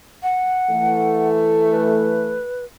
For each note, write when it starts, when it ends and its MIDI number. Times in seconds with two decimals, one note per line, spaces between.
0.23 1.28 78
0.71 2.38 52
0.71 2.38 57
1.70 2.64 71